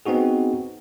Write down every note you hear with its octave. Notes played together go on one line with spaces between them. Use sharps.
B3 C4 D#4 F#4 G#4